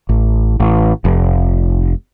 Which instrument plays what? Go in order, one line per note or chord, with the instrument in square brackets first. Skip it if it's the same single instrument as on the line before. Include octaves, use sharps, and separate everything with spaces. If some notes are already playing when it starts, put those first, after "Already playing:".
[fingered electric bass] A1
A1
F1